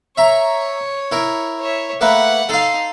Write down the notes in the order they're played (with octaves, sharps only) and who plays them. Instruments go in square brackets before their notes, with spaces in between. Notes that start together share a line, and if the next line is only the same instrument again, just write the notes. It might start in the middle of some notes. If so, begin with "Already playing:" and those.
[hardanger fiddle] C#5 [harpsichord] E5 A#5
[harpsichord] E4 A#4
[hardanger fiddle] C#5 E5
[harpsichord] A3 A#3 B4 [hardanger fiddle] F#5
[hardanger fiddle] D#4 C6 [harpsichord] A4 F5